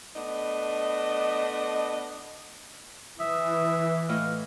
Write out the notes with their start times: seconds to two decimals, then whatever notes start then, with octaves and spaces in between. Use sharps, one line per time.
0.16 A3 B3 D4 D#5
3.20 E3 E5 D#6
4.09 A2 E4 D#5 F5